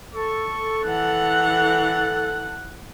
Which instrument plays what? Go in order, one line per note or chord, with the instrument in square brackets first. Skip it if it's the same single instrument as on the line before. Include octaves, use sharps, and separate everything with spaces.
[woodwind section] A4 [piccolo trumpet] C#6
[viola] E3 F#5 [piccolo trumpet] F#6